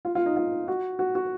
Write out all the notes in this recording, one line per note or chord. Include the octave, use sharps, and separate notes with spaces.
F4
F4
D#4
F4
F#4
F#4
F#4